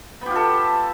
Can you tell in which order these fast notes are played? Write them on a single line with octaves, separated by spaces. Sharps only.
B3 G4 F4 A4